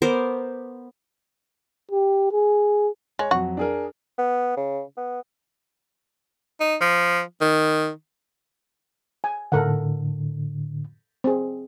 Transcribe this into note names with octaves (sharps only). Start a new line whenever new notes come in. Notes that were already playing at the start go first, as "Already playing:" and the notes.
B3 A#4 C5 D6
G4
G#4
G#3 C#5
F2 F#3 F#4
D4 G#4 A#4
B3
C#3
B3
D#4
F3
D#3
G#5
A2 D3 A4 A#4 F#5
C4 G#4